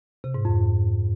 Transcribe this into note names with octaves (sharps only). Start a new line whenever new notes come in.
C3
G#2
F2